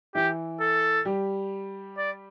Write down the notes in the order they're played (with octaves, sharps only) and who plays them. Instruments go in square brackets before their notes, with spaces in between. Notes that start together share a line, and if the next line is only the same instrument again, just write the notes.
[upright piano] E3 E4 [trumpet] G4
[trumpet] A4
[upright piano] G3 G4
[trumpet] D5